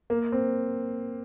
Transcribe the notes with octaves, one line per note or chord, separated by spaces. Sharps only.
A#3
C4